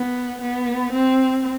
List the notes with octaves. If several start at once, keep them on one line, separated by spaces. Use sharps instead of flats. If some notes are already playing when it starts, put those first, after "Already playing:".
Already playing: B3
B3
C4